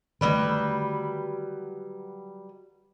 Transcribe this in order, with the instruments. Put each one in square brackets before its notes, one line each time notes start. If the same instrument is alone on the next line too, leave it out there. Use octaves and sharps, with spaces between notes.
[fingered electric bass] D3 D#3 A3 [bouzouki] F#3 G3 B4